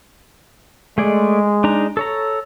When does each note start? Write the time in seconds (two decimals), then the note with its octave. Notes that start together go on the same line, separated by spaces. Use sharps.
0.98 G#3 A3 G#4 D5
1.64 D4 D#4 A#5
1.97 A4 C#5 A#5